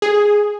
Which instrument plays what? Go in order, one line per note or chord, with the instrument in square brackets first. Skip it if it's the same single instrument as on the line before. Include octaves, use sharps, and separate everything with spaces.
[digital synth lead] G#4